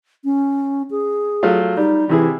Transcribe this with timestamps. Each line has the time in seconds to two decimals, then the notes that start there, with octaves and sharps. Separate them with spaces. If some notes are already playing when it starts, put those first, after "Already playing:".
0.25 C#4
0.91 G#4
1.43 F#3 A3 F4
1.77 G3 D#4
2.09 C3 E3 E4 G#4